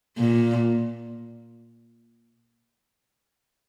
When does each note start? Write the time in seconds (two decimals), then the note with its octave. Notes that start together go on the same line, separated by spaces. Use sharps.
0.18 A#2